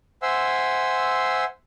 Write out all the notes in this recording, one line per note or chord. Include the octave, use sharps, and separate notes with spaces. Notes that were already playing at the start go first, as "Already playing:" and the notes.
C5 E5 F#5 G#5 C6 E6